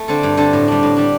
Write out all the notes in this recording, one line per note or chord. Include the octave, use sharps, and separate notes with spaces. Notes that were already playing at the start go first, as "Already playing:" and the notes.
Already playing: A3 E4
D3 C4 A4
G2
D3 C4 A4
A2
G3 D4
A2
G3 D4